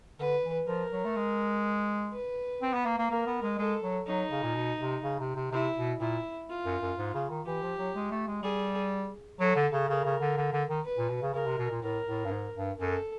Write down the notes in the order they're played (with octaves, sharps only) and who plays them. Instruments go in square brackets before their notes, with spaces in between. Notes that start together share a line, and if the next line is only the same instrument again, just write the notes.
[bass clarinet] D3 [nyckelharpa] B4
[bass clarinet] E3
[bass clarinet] F3 [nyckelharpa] A#4
[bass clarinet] F#3
A3
G#3
[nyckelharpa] B4
[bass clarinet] C4
B3
A#3
A#3
[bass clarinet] A#3 [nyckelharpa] A#4
[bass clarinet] B3
G#3
[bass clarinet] G#3 [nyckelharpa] A4
[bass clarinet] F#3
[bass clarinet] F#3 [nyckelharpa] D#4
[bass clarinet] C#3
A#2
B2
C3
C#3
C3
C3
[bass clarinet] C3 [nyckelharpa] E4
[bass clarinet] B2
[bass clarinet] A#2 [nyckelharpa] E4
[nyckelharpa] F4
[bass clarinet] F#2
F#2
G#2
C#3
D#3
[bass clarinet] E3 [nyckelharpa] G4
[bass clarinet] F3
F#3
G#3
A3
G#3
[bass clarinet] G3 [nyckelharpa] G#4
[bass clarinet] F#3 [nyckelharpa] A4
[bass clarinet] D3
C#3
[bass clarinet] C#3 [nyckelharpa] A#4
[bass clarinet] C#3
D3
D3
D3
D#3
[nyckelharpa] B4
[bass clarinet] A#2
B2
C#3
[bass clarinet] C#3 [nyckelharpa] A#4
[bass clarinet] C3
B2
A#2
[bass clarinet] A2 [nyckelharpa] A#4
[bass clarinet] A2
G2
G#2
G2
[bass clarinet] F#2 [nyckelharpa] A4